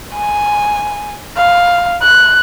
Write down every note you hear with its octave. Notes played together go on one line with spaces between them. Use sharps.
G#5
F5
F#6